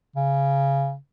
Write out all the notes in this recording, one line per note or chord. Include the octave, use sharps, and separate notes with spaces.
C#3